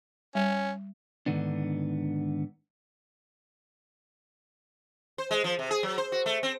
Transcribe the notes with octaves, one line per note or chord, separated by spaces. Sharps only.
G3 C#4
G#2 D3 D#3 B3 D4
C5
G#3
F3
C3
G#4
F#3
C5
F#4
A3
C4